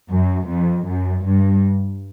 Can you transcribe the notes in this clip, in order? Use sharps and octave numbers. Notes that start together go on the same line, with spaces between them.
F#2
F2
F#2
G2